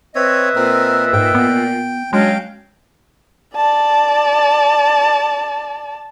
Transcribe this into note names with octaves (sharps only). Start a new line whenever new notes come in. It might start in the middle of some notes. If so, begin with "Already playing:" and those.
C4 B4 C#5 D#5 E5
A#2 C4 A#4
G#2 G5
B3
F#3 G#3 C#4 D4 F5 G5
D5 A5